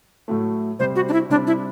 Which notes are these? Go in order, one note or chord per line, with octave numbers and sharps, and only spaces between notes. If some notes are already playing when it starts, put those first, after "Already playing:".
A2 F#3 A3
C3 G3 C4 C5
F#4
D4
E4
C3 G3 C4 D4
E4